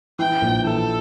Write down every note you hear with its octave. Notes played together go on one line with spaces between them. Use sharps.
E3 G5
A#1
E3 A4